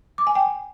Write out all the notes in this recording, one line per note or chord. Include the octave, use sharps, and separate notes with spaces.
D6
G#5
G5